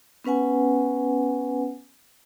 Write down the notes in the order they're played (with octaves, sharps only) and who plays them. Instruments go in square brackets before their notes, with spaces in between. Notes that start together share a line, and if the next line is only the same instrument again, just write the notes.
[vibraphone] B3 C#4 B4 F#5 G#5